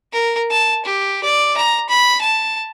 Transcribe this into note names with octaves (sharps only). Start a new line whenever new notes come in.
A#4
A5
G4
D5
A#5
B5
A5